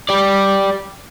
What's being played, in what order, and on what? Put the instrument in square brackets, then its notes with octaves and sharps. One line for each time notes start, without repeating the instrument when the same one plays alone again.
[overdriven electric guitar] G4 D5